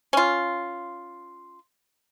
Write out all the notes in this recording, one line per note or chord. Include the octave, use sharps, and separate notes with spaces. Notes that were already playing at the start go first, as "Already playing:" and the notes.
C#4 F4